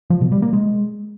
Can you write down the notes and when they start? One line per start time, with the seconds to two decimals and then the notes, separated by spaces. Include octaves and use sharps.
0.10 F3
0.21 B2
0.32 G3
0.42 A#3
0.53 G#3